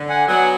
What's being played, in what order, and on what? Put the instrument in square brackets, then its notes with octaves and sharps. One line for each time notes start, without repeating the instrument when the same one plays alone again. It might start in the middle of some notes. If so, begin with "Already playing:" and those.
Already playing: [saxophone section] D3
[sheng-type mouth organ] F#5 G#5
[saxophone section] F#3 B3 [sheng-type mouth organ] F#5 G#5